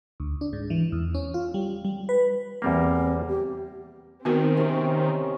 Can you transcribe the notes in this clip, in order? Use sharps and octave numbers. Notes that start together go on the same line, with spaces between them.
D2
D4
G#2
E3
E2
C#4
F4
G3
G3
B4
E2 G3 A#3 C4
G4
D#3 B3 C4 F#4 A#4
C3 C#4